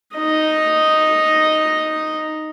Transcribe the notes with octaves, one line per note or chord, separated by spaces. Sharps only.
D#4 D#5